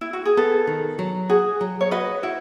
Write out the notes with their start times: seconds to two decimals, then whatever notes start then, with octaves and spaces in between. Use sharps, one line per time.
0.01 E4
0.13 F#4
0.26 G#4
0.37 B3 A4
0.67 D#3
0.99 F#3
1.29 F#4 G#4
1.61 F#3
1.81 C#5
1.91 F#4 B4 D#5
2.23 E4 F#4